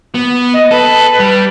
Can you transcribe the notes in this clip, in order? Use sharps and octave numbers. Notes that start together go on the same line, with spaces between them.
B3
D#5
A4 B4
G3